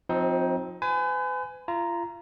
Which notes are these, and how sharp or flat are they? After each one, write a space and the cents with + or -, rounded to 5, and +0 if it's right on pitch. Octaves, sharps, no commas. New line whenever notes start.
F3 +35 C4 +0 D#4 +20
B4 +40 G#5 +5
F4 -35 A#5 +5